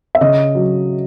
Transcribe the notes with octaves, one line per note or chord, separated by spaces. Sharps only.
E5
C#3 D#5
F#3